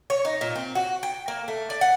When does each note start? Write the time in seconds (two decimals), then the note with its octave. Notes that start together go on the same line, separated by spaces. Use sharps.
0.10 C#5
0.25 D#4
0.41 A#2
0.55 C4
0.75 F#4
1.03 G5
1.28 A#3
1.48 A3
1.70 D5
1.81 F#5